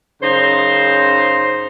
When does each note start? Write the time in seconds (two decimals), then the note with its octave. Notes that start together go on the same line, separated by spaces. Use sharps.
0.22 F#2 C#3 D#4 C5